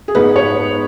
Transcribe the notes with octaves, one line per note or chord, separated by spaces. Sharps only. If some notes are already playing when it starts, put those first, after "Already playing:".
G#4
G#2 G#3 B3 D#4 B4
C#5